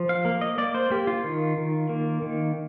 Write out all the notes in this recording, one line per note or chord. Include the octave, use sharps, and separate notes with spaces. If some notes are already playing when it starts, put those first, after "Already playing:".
Already playing: F3
F5
A#3
D#5
A#3 D5
C5
A#3 G4
F4
D#3
D#3
A#3
D#3